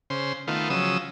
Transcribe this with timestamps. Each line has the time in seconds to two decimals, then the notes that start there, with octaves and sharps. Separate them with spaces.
0.10 C#3 C5
0.47 D#3 A3 B3 F4
0.70 C#3 F3 F#3 D#6 E6